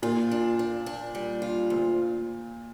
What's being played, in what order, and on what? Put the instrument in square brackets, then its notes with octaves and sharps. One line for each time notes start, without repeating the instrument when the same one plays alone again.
[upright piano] A#2 [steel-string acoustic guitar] F4
[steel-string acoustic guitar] D4
D4
D4
G3
F4
D2